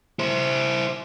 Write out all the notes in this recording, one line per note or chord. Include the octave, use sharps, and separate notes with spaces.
E4 C5